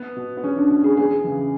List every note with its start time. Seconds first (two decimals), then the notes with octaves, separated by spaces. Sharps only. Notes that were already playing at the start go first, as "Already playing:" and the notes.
Already playing: B3
0.16 B2
0.37 B3
0.43 E2 C#4
0.56 D4
0.70 B2
0.84 G#4
0.97 E2 G#4
1.24 C#3 E3